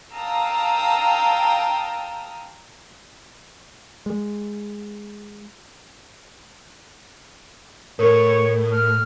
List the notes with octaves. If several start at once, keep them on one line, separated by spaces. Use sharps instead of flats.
F5 G5 A5 A#5 D#6 E6
G#3
A2 A#4 C#5
F6